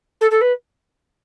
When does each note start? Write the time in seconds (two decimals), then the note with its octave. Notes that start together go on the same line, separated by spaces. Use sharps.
0.21 A4
0.31 A4
0.41 B4